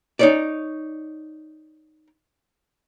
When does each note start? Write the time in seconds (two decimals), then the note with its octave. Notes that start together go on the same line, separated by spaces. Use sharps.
0.19 D#4 C#5 D5